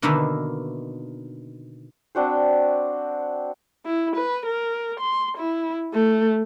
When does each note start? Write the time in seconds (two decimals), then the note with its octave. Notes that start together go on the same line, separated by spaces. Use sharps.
0.02 B2 D3 D#3 A#3 D#4 E5
2.15 C4 D4 F#4 C5
3.85 E4
4.16 B4
4.46 A#4
5.00 C6
5.38 E4
5.94 A3